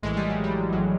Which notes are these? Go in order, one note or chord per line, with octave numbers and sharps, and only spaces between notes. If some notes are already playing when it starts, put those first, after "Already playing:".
A#1 A2 E3 G#3
G3
F#3
G3
A#1 A2 E3 F#3